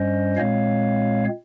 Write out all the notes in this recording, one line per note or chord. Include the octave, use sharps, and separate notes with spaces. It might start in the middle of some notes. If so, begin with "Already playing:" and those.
Already playing: G2 G3 C#4 C5 D#5
A#2 G#3 C4 C#5 F5